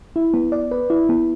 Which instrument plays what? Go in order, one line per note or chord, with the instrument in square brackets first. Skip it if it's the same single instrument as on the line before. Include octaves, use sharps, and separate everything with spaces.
[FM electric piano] E4
B3
D5
B4
E4
B3